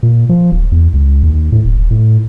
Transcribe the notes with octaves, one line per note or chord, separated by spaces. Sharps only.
A#2
F3
D1
E2
C#2
D#2
A2
D1
D1
A2